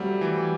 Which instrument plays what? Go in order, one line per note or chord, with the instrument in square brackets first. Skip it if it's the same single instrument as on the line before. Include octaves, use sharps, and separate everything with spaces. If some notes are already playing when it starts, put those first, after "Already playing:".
Already playing: [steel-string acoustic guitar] F#3 F#4 [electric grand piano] G3 A3 C4
[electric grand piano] E3